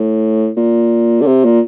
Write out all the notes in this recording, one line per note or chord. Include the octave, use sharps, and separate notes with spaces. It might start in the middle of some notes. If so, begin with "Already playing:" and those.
Already playing: A2
A#2
D3
C3
A#2